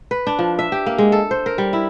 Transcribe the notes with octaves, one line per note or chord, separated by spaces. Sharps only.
B4
D4
F3
E5
G4
A#3
G#3
A4
C5
A#4
G3
E4